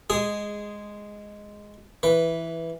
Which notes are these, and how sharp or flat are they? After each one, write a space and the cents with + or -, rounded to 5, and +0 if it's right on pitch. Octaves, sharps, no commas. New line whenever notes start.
G#3 +0 G#4 -10 D#6 +0
E3 +0 B4 +0